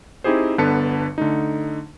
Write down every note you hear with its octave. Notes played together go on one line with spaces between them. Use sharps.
C4 D#4 E4 G4 G#4 C5
G1 D3 B3 B4 A5 C#7
D3 A3 D#4